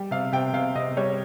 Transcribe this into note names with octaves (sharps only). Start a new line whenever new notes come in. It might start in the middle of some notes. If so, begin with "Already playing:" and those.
Already playing: G3 G5
C3 F5
C3 G5
C3 F5
C3 D#5
G3 C#5